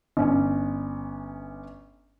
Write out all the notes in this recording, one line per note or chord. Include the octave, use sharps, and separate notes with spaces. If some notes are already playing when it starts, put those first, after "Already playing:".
G1 C#4